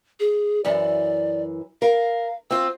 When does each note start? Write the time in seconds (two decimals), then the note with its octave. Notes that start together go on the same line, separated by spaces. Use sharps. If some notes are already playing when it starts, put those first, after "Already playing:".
0.20 G#4
0.65 F#2 E3 D5
1.82 A#4 F5
2.51 C4 F4 E6